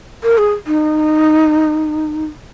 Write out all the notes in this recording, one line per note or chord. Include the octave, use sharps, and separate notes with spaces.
A#4
G#4
D#4